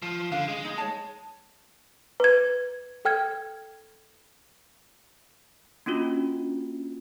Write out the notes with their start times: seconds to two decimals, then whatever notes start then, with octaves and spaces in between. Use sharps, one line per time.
0.02 F3
0.32 D3 F5
0.48 G#3
0.65 D#4
0.78 C#5 A5
2.20 B4 G#6
3.05 A4 G5 F6 G#6
5.86 A#3 C#4 D4 F4 F#4